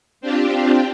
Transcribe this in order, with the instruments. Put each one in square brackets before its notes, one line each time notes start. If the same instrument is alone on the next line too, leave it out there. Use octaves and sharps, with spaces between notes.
[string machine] C4 D4 F4 G4